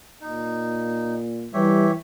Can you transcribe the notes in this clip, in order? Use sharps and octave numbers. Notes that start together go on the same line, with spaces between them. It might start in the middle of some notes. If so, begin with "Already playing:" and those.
A#2 D#4
E3 G3 G4 C#5 E5